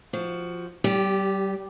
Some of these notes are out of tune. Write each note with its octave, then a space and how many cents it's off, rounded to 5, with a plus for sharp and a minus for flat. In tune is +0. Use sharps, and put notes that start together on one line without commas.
F3 +0 F#4 +15
G3 -30 G4 +0